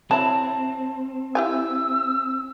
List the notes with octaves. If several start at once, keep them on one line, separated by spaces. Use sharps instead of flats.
F#3 C4 E4 A5
E4 G4 G#5 E6